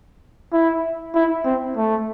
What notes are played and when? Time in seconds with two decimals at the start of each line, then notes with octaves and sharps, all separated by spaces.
0.53 E4
1.15 E4
1.45 C4
1.77 A3